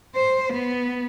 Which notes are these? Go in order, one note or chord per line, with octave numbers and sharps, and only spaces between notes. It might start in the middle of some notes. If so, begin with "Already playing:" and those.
C5
B3